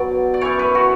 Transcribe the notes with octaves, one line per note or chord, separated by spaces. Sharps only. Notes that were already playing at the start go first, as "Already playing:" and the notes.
Already playing: B2 F#3 D5
D5
F#2 E3 C#5
B4
F#4